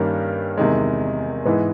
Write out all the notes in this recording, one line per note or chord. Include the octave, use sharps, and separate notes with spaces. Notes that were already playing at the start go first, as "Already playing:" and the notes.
Already playing: G2 D#3 G3 A#3 C#4
E2 C3 D#3 G#3
G#2 E3 G#3 B3